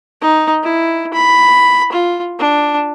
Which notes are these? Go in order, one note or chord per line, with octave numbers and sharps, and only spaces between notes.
D#4
E4
B5
F4
D4